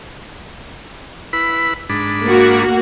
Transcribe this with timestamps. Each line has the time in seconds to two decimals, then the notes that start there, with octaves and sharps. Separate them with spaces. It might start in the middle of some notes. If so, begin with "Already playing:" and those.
1.33 E4 B4 B5
1.89 G#2 D4 B5
2.24 A#3 F#4